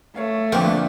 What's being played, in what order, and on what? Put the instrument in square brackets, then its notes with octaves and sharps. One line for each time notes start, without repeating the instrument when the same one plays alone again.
[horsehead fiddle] A3 [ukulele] C#5 F5
[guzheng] F2 D3 [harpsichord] A#3 G4 C5 [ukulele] G#4 B4 G5